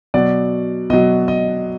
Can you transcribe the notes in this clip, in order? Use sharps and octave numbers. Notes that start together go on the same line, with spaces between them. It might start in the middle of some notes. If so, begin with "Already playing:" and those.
B2 F#3 D5
B2 F#3 D#5
D#5